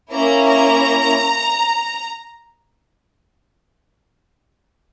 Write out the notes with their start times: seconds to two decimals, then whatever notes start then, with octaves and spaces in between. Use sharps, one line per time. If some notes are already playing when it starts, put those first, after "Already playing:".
0.11 A#3 C#4 E4 A#5
0.47 A#5